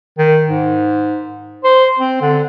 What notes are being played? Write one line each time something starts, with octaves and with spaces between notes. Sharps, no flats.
D#3
G#2
C5
C4
D3